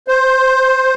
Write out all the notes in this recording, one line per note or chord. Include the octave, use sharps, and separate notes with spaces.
C5